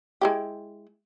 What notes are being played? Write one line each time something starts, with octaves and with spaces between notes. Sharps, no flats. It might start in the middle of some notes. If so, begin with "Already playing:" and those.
G#3 E4 G4